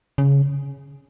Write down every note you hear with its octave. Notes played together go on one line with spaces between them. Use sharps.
C#3